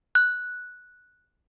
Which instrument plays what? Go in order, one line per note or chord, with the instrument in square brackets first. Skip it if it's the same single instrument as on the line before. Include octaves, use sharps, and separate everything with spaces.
[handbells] F#6